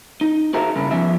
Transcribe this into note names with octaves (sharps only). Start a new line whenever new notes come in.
D#4
F#4 G#4 A#4 C5 E5
G2 C#3 E4
F3 B3 G#4 E5